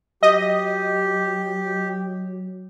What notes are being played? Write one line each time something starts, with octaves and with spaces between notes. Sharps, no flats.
F#3 G4 D#5